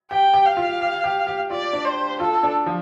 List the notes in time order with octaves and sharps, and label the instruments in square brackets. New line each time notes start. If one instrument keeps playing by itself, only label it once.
[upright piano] G4 [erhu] G5
[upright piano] G4
[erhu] F5
[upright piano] F4
G4
G4
G4
[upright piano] F4 [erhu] D5
[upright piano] D4
[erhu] C5
[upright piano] F4 [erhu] A4
[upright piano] D4
F3